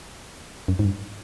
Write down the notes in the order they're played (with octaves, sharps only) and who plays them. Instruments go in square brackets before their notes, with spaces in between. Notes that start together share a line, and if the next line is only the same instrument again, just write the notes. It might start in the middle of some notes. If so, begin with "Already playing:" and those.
[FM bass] F#2
G#2
G2